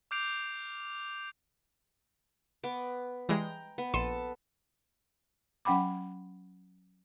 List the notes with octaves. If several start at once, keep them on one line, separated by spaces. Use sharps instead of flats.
D6 F6 G6 C7 D7 F7
B3 D6
E3 G3 G#3 G5 A#5
B3
A#1 A4 C6 D#7
F#3 C#4 F#5 G5 B5 D6